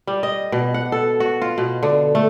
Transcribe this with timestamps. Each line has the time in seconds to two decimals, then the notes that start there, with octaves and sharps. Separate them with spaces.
0.07 G3
0.23 D#5
0.52 B2
0.74 F#5
0.92 A4
1.20 F#4
1.42 F4
1.58 B2
1.83 D3
2.15 A3